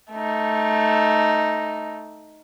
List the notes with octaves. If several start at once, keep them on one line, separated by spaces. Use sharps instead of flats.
A3 D#4